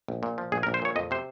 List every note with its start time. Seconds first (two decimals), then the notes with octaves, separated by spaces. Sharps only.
0.08 A#1
0.23 A#2
0.38 F3
0.52 A#1 G#4
0.63 A#4
0.67 A#1
0.74 C5
0.82 A#2 C#5
0.96 F2 D#5
1.11 C3 C5